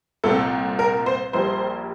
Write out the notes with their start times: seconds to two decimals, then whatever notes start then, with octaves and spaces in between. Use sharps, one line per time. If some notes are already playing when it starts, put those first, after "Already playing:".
0.24 C2 A#2 A3 C4 A4
0.79 A#4
1.06 C5
1.33 A#1 A#2 G3 A#3 C5